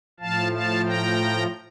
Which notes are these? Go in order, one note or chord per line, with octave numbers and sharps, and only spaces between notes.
A2 F3 F5 A5
F5 A5
G5 A#5